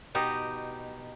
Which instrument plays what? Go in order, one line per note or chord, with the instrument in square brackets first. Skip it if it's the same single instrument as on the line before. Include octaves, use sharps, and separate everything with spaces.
[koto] B2 D#4 G4